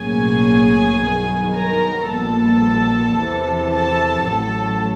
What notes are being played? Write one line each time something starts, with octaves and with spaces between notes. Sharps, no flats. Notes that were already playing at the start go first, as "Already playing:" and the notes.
Already playing: B1 A2 F#3 A#3 C#4 G#4 G#5
G2 D#3 F#3 B3
A#4 A#5
A#1 A#2 G3 B3 A4 A5
E2 C3 E3
A4 A5
A1 A2 F#3 A4 A5